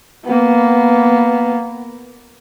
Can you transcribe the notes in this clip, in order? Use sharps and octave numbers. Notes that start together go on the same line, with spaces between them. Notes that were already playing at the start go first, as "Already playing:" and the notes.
A#3 B3